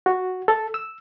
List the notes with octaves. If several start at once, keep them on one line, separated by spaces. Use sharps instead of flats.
F#4
A4
E6